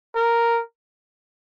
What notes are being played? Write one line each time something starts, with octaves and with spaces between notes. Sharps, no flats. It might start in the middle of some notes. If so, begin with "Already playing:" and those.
A#4